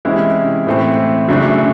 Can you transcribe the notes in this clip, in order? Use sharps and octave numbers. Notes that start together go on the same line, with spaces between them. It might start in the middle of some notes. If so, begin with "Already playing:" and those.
C3 E3 G#3 C#4 E4
A2 E3 A3 C4
F#2 C#3 F#3 A3 D4